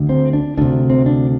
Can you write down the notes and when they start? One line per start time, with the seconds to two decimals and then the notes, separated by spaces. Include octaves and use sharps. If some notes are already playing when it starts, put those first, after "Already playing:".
Already playing: D2 D3
0.09 C4
0.33 D4
0.57 D2 C3 D4
0.90 C4
1.06 D4